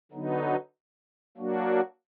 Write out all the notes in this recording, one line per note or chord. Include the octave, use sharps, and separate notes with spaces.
D3 F#3 B3 D#4
F#3 A#3 D4 F#4